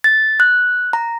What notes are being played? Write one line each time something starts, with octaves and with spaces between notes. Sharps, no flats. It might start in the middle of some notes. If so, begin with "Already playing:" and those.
A6
F#6
A#5